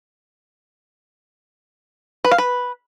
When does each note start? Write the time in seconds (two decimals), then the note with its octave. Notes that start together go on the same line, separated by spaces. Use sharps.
2.25 B4
2.31 F5
2.38 B4